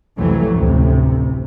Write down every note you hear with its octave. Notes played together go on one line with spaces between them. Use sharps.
C2 F2 E3 F#3 A3
A1 D2 C3